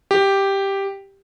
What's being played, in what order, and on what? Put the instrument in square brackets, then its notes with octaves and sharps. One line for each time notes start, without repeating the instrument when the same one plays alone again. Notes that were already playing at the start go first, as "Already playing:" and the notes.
[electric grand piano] G4